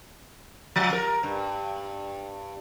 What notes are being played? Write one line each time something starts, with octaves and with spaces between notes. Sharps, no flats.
F3
A#4
G2